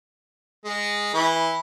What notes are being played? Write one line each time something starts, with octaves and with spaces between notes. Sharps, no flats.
G#3
E3 E4 B4